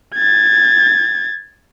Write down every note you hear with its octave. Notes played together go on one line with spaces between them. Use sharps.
G#6 A6